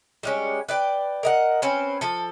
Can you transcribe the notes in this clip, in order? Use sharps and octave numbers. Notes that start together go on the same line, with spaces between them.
G3 G#3 C#4
B4 D5 G5
A#4 D#5 F#5
C4 C#4 B4 C5
F3 A4